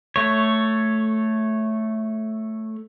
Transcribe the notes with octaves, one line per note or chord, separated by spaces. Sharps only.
A3 C#5